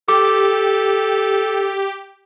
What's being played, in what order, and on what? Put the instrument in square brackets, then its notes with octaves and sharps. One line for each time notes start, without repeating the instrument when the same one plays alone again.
[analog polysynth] G4 [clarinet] A4 [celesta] D6